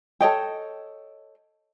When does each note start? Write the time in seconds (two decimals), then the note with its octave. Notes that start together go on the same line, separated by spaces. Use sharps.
0.21 A4 C#5 D#5 G5